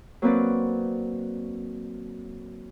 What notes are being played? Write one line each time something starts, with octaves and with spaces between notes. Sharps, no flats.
F#3 A#3 C4 B4 D5